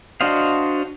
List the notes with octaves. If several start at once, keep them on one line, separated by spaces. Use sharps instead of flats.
D4 F#4 C5 D#5 F5